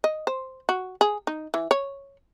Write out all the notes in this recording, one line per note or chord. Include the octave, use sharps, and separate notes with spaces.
D#5
C5
F#4
G#4
D#4
E3
C#5